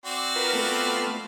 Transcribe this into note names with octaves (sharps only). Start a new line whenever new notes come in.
C4 F#4 D5
F4 A#4 B4
A3 B3 F4